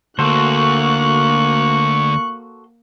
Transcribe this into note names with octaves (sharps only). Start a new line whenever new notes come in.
D2 A#3 F#4 A4 C5 C#6 F#6